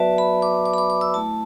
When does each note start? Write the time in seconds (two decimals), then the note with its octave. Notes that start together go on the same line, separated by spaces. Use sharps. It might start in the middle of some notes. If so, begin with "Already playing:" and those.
Already playing: F#3 B3 F#4 B4 D5 E5 A5
0.18 B5
0.42 D6
0.66 D6
0.74 B5
0.78 D6
0.90 D6
1.01 E6
1.14 A3 E4 A5